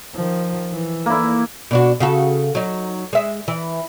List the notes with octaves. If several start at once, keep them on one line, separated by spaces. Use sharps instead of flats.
D#3 F3
E3
A#3 E4
B2 D4 F#4
C#3 F#4 A4
F#3 D#4
G#3 E5
E3